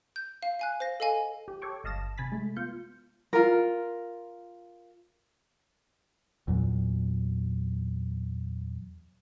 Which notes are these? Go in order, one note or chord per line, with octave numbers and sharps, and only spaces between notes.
G6
F5
F5 G#5 F#6
C5 F5 A#6
A4 D#5 F5 G#5
G4
A4 C#5 G5 C#6 D6
G1 D#5 F5 A5 A#6 E7
C3 G#5 B5 A6 B6
G#3 A3
B3 F4 G6 C#7
F4 A#4
E2 A#2 F#3